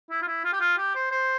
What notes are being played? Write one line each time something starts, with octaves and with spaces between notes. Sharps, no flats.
E4
F4
E4
F4
G4
F4
G4
C5
C5